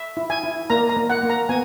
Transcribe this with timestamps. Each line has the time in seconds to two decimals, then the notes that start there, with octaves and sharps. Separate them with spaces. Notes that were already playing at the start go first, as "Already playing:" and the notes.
Already playing: E5
0.17 E4
0.30 G#5
0.44 E4
0.70 A#3 A#5
0.89 A#5
0.97 A#3
1.10 F#5
1.23 A#3
1.30 A#5
1.49 B3 G#5